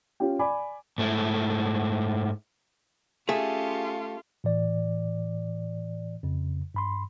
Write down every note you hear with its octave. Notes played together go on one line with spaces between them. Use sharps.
C#4 F4 G4 G5
D5 G#5 B5 D6
G#2 A3 E4
A3 C#4 F4 G4 G#4
A2 E3 D5
F2 C#3
G2 B5 C6